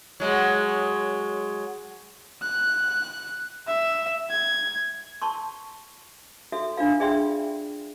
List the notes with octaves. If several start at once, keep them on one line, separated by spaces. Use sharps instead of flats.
F#3 G#3
F#6
E5
G#6
A5 C6 C#6
F#4 A4 E5
D4 F4 F5
G#4 D5 E5 G5 C6